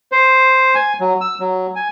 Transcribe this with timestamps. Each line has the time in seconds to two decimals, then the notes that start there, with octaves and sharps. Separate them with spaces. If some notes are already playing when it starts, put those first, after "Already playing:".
0.12 C5
0.75 G#5
1.00 F#3
1.21 E6
1.40 F#3
1.76 G#5